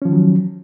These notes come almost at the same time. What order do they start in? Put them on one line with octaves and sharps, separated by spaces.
C#4 F3 D#3 F#3